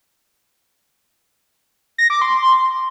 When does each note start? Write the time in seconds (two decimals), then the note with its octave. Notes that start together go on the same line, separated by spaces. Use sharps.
1.98 A#6
2.10 D6
2.22 C6